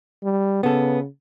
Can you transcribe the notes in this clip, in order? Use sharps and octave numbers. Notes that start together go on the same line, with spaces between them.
G3
C#3 B3 A4